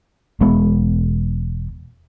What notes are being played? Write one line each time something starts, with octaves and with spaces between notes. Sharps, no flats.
E1 G#3 B3